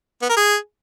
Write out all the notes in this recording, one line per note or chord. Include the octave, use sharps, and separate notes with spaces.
B3
A#4
G#4